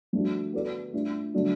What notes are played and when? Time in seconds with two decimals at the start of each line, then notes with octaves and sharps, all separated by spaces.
0.13 F3 A3 D4 F#4
0.53 B3 F#4 A4 D5
0.93 A3 D4 F4
1.34 D3 F#3 A3 D4 F#4